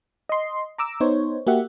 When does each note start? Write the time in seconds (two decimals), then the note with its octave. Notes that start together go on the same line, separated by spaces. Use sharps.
0.29 D#5 C6
0.78 A#5 D6 E6
1.00 B3 D#4 C5 C#5
1.47 A#3 F#4 G4 E5 F#5